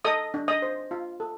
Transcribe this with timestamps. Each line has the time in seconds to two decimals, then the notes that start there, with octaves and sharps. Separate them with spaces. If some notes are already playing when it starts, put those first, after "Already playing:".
0.05 A4 D#5 D#6
0.34 D4
0.48 D#5 D#6
0.62 C5
0.91 F4
1.20 A4